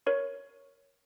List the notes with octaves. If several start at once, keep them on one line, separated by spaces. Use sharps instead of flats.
A#4 C#5 C#6